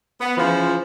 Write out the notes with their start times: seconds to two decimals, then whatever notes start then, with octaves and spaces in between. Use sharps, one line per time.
0.20 B3
0.37 C#3 E3 F3